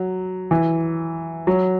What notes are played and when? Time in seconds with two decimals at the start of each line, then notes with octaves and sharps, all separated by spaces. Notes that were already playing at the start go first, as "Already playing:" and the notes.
Already playing: F#3
0.51 E3
1.47 F#3